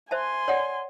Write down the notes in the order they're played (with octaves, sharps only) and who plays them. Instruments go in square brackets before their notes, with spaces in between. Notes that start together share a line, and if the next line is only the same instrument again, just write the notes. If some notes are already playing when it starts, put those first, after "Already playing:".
[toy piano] C5 E5 A5 [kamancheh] G#5 C6
[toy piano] C#5 D5 F#5